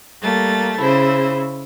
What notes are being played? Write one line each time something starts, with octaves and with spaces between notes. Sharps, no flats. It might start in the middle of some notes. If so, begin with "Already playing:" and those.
G3 A3 A#3 A6
C#3 E4 C5